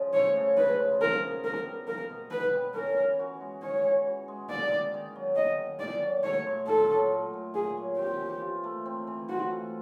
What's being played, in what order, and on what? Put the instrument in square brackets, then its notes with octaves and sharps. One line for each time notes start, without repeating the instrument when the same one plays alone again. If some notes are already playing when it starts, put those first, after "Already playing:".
Already playing: [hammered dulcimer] C#3 F3
[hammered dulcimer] A3 [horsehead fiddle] C#5
[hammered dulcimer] C#3
[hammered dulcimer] C#3 [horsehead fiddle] B4
[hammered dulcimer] F3
[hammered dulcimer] A#3 [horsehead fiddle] A#4
[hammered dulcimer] B2
[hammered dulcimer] B2 [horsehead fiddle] A#4
[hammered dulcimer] G3
[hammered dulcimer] A#3 [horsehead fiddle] A#4
[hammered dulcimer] B2
[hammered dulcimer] B2 [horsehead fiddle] B4
[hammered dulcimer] G3
[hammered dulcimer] C#4 [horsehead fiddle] A#4
[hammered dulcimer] E3
F#4
G#3
[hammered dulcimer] C#4 [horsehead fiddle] C#5
[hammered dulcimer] E3
F#4
G#3
[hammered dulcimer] A#3 [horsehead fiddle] D5
[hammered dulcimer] D#3
D#3
F#3
[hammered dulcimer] A#3 [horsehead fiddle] D#5
[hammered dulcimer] D#3
[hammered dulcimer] D#3 [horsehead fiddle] D5
[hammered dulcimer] F#3
[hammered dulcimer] A3 [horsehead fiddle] C#5
[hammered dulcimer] A#2
[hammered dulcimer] A#2 [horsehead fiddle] A4
[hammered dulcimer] F#3
A3
A#2
[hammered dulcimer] A#2 [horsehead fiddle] G#4
[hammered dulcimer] F#3
[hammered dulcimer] C4 [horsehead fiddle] G4
[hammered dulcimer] E3
F4
A3
C4
E3
[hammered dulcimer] F4 [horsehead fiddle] F#4
[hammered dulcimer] A3